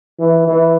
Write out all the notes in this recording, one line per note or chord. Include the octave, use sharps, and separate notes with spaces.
E3
E3